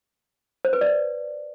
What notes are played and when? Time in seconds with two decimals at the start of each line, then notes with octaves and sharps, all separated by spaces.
0.65 C5
0.73 B4
0.81 D5